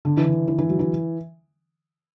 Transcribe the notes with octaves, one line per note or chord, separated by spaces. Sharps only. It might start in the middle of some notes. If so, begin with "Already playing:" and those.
D3
E3
D3
E3
E3
F#3
E3